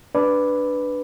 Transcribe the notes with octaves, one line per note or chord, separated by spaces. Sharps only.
D4 B4 D5